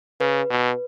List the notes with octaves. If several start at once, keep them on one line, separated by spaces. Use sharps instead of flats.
C#3 B4
B2